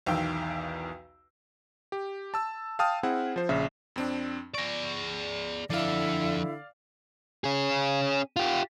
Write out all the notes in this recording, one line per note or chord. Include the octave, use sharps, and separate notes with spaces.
B1 E2 D#3 F5 G5 E6
G4
A5 E6
F5 G5 A5 D#6 F6
C4 E4 G#4 F#5
F3 C5
A#1 C#3 E5
F2 C4 D4
G#4 D5 C#6 A#6
D3 F3 E4 A4 D5 F5
C#4 G#4
F4 G4